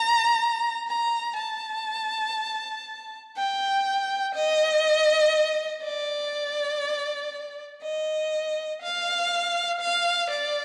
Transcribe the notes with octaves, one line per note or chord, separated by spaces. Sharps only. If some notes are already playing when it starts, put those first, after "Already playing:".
Already playing: A#5
A#5
A5
G5
D#5
D5
D#5
F5
F5
D5